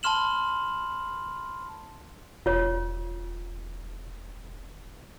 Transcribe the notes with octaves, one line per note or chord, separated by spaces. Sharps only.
A5 B5 C6 F6 E7 F#7
E1 F4 C#5